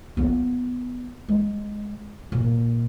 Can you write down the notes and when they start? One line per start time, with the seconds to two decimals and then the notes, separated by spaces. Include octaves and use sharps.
0.17 B3 F4
1.28 G#3
2.32 A#2